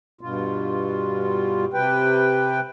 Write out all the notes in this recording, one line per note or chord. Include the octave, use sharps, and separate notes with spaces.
G2 B2 F4
C3 B4 G5